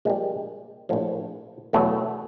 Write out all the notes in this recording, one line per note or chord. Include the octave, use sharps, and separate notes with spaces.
A#1 A#2 G3 G#3
A#1 A2 F3
E2 B2 F#3 A3